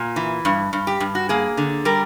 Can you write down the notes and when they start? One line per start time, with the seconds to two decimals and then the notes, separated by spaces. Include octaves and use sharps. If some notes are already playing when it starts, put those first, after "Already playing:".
Already playing: A#2
0.16 E3
0.45 G2
0.73 G2
0.87 G4
1.00 G2
1.15 F#4
1.29 A#3 G#4
1.57 D3
1.85 G3 A#4